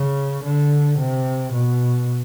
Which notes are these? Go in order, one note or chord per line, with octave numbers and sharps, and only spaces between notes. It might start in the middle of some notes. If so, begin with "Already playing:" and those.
Already playing: C#3
D3
C3
B2